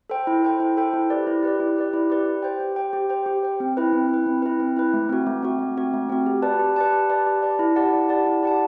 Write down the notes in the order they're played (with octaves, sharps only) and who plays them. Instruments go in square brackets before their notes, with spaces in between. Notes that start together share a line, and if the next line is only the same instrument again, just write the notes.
[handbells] A4 C5 G5
E4
A4 C5 G5
E4
A4 C5 G5
E4
G4 B4 D5
E4
G4 B4 D5
E4
G4 B4 D5
E4
G4 B4 D5
G4
C5 G5
G4
C5 G5
G4
C5 G5
G4
C5 G5
C4
E4 B4
C4
E4 B4
C4
E4 B4
C4
E4 B4
A3
C4 F#4
A3
C4 F#4
A3
C4 F#4
A3
C4 F#4
G4
B4 D5 A5
G4
B4 D5 A5
G4
B4 D5 A5
G4
B4 D5 A5
E4
G4 D5 F#5 A5
E4
G4 D5 F#5 A5
E4
G4 D5 F#5 A5